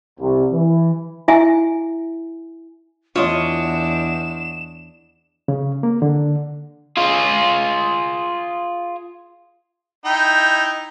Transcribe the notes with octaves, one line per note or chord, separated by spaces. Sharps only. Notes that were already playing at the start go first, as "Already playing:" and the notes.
C2
E3
E4 E5 G#5
E2 D4 F4 C#5 D#5 E7
C#3
A#3
D3
F4 G#4
D#4 E4 G5